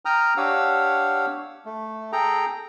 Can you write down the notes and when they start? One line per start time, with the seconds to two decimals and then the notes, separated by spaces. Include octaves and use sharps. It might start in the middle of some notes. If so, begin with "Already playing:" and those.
0.05 G5 A#5 D#6 F6
0.37 D4 G4 C#5 F5 F#5 E6
1.65 A3
2.12 G#4 A4 G5 A#5